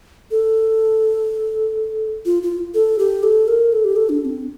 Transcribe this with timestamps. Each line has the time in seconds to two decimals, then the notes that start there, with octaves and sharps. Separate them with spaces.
0.31 A4
2.26 F4
2.43 F4
2.74 A4
2.99 G4
3.23 A4
3.48 A#4
3.73 A4
3.85 G4
3.96 A4
4.09 D4
4.21 D4
4.25 C4